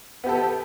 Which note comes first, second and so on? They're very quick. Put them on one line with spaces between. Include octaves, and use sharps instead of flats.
B3 G4 A4